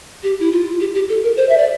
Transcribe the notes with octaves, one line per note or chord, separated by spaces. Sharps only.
G4
E4
F4
G4
G4
A4
A#4
C5
E5
D5